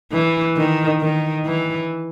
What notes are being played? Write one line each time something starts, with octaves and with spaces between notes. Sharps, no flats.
E3
D#3
D#3
E3